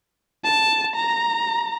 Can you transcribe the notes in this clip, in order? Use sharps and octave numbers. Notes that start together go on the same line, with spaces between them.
A5
A#5